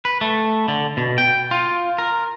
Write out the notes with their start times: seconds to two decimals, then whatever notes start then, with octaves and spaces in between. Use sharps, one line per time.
0.05 B4
0.21 A3
0.68 D3
0.97 B2
1.18 G5
1.51 F4
1.98 A#4